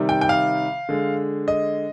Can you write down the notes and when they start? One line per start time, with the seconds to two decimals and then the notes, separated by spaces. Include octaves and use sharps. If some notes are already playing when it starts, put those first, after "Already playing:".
Already playing: C3 D#3 G3
0.09 G5
0.21 G5
0.29 F5
0.89 D3 G#3
1.48 D#5